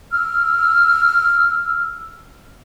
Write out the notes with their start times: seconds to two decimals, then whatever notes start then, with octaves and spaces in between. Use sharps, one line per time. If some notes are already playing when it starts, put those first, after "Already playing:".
0.12 E6 F6